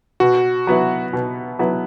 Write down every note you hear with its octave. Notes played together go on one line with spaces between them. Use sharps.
B2 F#4
F#3 B3 E4
B2
F#3 B3 E4